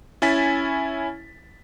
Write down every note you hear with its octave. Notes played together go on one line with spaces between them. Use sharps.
C#4 E4 G#5 A6 B6